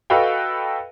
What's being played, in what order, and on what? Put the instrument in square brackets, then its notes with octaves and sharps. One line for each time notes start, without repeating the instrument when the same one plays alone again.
[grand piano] F#4 A4 B4 D#5 F5 G5